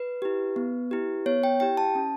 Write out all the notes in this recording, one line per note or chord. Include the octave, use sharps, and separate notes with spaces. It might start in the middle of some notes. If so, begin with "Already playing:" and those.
Already playing: B4
E4 G4
B3
E4 G4
B3 C#5
G5
E4 G4 G5
A5
C#4